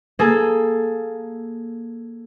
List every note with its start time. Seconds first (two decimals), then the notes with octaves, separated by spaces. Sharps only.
0.19 A#3 G#4 A4